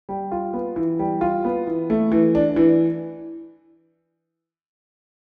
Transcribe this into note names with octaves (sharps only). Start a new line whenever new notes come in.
G3
F4
B3
E3
G3
F4
B3
E3
A3
E3
D4
E3